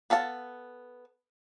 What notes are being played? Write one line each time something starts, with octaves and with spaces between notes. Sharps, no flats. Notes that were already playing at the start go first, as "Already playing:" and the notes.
B3 A4 F5 A5